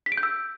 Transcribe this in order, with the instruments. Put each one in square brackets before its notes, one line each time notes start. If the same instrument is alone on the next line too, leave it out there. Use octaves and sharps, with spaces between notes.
[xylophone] B6
D7
G6
E6